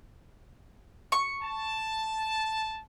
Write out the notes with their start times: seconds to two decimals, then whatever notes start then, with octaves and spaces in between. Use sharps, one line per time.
1.12 C#6
1.42 A5